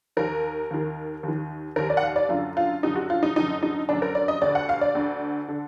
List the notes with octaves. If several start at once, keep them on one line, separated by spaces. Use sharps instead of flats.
D#2 D#3 A#4
D#2 D#3
D#2 D#3
D#2 D#3 A#4
D5
F#5
F5
D5
F#2 D3 F4
F4
F#2 D3 D#4
F#4
F4
D#4
F#2 D3 D#4
D#4
F#2 D3 D4
A#4
D5
D#5
D2 D3 D5
F#5
F5
D5
D2 D3
D3